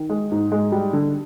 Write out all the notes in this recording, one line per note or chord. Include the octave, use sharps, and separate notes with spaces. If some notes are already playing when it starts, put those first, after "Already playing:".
Already playing: D#3
G#3
G#2
G#3
G3
D3